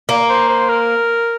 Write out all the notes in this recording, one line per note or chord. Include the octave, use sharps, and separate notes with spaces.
A#3
C5
C5
A#4